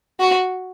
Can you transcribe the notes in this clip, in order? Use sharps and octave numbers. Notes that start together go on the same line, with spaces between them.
F#4